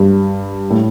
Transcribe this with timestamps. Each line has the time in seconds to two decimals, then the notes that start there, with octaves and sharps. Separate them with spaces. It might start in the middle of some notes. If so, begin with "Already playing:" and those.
Already playing: G2
0.70 A2